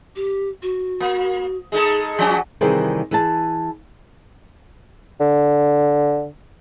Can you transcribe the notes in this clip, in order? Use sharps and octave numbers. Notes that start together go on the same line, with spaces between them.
G4
F#4
A#3
G#3 D#4 G#4 A4
F3 C#4 F#4 G#5
C3 D#3 E3 G3 G#4 C5
E3 G#4 A5
D3